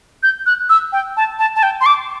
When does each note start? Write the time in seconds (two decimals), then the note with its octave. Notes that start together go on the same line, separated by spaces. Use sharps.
0.23 G6
0.46 F#6
0.69 E6
0.92 G5
1.17 A5
1.39 A5
1.56 A5
1.63 G5
1.81 C6
1.86 D6